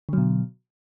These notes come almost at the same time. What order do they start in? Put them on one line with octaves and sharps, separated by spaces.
D3 F#3 B2